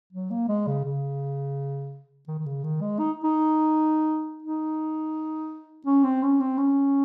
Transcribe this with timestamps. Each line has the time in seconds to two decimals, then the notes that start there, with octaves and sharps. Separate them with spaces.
0.13 F#3
0.31 A#3
0.48 G#3
0.67 C#3
0.85 C#3
2.28 D#3
2.38 D#3
2.46 C#3
2.64 D#3
2.81 G#3
2.99 D#4
3.24 D#4
4.42 D#4
5.86 C#4
6.04 C4
6.23 C#4
6.40 C4
6.58 C#4